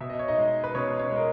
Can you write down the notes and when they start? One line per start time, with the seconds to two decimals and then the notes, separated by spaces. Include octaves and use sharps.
0.01 B2 E5
0.10 D#5
0.19 C#5
0.28 D#4 D#5
0.38 G#3
0.64 B4
0.75 B2 C#4 C#5
0.99 C#4 C#5
1.12 G#3 A#4